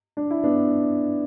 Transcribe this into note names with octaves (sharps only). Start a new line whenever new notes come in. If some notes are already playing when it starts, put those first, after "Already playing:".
D4
E4
B3 D4